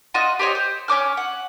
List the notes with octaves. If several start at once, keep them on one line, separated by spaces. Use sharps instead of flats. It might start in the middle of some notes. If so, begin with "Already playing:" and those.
F4 F#4 D#5
G4 C5 C#5 D#5
C5
C#4 C#5 D6 F6
F#5